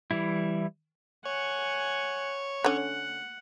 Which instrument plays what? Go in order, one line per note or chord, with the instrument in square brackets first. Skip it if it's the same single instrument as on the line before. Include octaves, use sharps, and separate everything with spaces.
[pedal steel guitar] E3 G3 E4
[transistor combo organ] C#5 [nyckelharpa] F#5 G#5
[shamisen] D3 C#4 [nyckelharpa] F#5